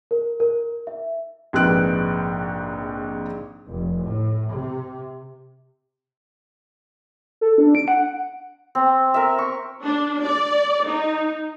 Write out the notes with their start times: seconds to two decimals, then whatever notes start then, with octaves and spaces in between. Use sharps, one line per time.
0.11 A#4
0.40 A#4
0.87 E5
1.53 A#1 G#2 C3 B4 F#6 D7
3.66 F1
4.01 A2
4.51 C3
7.41 A4
7.58 D4
7.75 D7
7.88 F#5
8.75 C4
9.14 A#4 E5
9.39 C#6
9.84 D4
10.24 D5
10.87 D#4